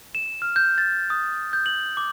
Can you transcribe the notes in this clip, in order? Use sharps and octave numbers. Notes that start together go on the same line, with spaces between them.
E7
F6
G6
A6
D#6
G6
F#7
D6